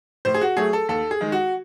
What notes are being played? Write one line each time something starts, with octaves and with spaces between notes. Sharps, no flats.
A2 C5
G#4
F#4
F#3 A3 G#4
A4
D#2 A4
G#4
D#3 G#3
F#4